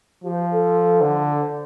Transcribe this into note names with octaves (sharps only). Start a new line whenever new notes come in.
F3 G4
C5
A4
D3
C5